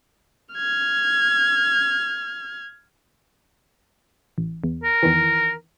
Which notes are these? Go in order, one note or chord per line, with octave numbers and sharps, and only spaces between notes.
F6 G#6
A1
E2
A#4
E2 D#3 E3